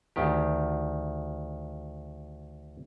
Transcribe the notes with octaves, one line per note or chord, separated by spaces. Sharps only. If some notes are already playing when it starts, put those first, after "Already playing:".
D2 D#3 G4